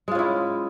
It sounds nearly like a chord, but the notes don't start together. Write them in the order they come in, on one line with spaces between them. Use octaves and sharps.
G#3 F4 C#4 E4